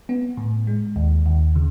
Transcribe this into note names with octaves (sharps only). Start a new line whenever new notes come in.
B3
A2
G#3
D#2
D#2
C#3